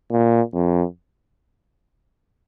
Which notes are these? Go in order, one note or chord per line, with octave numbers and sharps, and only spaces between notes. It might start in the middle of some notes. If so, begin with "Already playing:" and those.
A#2
F2